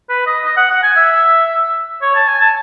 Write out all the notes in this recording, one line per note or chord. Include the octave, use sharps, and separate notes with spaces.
B4
D#5
D#5
F#5
F#5
G#5
E5
C#5
A5
G#5
A5